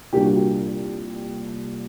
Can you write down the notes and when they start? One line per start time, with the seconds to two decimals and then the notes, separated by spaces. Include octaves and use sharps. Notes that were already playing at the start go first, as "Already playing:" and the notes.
0.13 C2 A#2 G3 A#3 D4 G4
0.24 F#4
0.36 G4